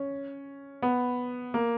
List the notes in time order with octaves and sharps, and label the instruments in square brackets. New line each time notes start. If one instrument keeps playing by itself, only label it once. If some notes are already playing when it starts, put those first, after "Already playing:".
Already playing: [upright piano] C#4
B3
A#3